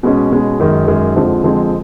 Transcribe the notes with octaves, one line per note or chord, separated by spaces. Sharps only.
B2 G#3 C#4
B2 G#3 C#4
F#2 D#3 G#3
F#2 D#3 G#3
F2 D3 F3 G#3 C4
F2 D3 F3 G#3 C4